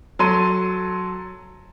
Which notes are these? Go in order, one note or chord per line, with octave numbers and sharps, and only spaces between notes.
F#3 A4 C6 D#7